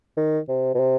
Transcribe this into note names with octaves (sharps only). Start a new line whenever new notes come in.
D#3
C3
B2
C3